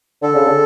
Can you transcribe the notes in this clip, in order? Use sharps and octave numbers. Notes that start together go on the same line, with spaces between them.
D3 A4
C#3
D3